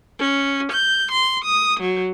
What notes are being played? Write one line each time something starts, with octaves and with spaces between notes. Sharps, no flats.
C#4
G6
C6
D#6
F#3